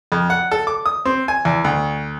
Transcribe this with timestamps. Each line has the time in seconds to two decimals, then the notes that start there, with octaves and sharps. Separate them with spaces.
0.12 F2
0.30 F#5
0.52 A4
0.67 D6
0.86 D#6
1.05 C4
1.28 G#5
1.45 E2
1.64 D2